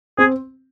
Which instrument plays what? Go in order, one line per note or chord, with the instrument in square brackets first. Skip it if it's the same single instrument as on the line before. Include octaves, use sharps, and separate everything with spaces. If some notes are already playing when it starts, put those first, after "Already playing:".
[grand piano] C4 [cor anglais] G#4